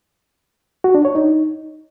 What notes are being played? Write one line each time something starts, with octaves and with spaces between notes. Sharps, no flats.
F#4
D4
C#5
D#4